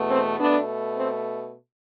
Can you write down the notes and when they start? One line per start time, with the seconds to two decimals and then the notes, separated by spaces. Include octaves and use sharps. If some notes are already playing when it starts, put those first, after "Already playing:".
Already playing: E2 B2 A3
0.11 C4
0.40 B2 A3 B3 D4
0.97 C4